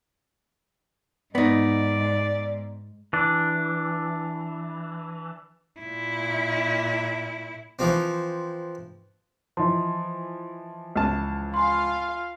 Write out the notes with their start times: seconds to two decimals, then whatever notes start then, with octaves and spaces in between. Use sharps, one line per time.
1.35 G#2 B3 D#4 D5
3.13 E3 D4
5.80 A#2 E4
7.79 E3 F3 C4
9.57 E3 F3 D#5 C6
10.96 C#2 A5
11.54 F4 F5 G#5 B5 C6